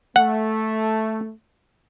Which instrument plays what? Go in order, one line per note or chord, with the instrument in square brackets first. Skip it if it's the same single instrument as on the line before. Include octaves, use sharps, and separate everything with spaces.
[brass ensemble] A3 [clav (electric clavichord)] F#5